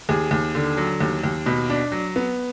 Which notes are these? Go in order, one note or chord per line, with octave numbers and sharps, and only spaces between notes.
D#2 G#4
D#2
D3
F#3
D#2
D#2
B2
D4
F#3
B3